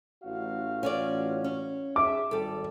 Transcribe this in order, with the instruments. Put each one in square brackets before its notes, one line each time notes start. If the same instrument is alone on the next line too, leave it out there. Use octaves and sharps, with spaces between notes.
[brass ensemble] A1 F#4 F5
[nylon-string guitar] C#4 F4 D5
C#4
[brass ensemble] G#4 E5 [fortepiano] D6
[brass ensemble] G#1 [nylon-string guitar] G3 A4